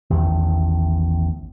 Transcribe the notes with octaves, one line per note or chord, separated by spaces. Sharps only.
A1 E2 D#3 A3